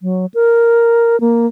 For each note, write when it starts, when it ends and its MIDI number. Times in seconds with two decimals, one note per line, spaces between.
0.02 0.26 54
0.34 1.19 70
1.20 1.46 58